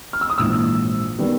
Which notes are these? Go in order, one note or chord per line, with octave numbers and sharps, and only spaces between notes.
F6
E6
D#6
A#1 G#2 E3 E6
D#3 G3 B3